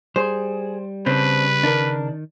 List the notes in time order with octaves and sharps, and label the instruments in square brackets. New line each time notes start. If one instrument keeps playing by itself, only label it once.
[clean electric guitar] G3 [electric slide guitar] G#4 [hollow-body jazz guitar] C5
[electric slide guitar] C#3 [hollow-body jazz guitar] C4 D4 [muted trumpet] B4
[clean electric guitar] D#3 [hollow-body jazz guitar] D4 A#4